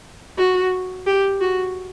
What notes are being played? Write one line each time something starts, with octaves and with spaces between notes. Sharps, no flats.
F#4
G4
F#4